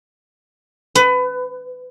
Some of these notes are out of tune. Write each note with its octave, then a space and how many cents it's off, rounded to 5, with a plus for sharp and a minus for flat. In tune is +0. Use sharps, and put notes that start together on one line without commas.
B4 +25